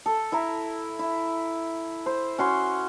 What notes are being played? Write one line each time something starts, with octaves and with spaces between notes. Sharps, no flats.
A4
E4 E5 A#5
E4
C5
C#4 F#4 C6